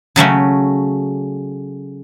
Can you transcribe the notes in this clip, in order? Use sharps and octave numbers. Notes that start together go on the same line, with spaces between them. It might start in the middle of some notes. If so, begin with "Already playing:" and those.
C#3 F#3 A3 C#4